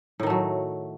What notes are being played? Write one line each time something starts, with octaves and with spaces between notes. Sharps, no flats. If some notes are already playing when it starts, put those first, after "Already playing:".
A2 D#3 F#3 A3